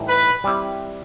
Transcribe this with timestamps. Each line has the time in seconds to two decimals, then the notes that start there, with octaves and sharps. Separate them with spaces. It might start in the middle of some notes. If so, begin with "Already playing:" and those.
Already playing: A2 E3 G3 D#4
0.08 B4
0.44 G3 C4 E4 G4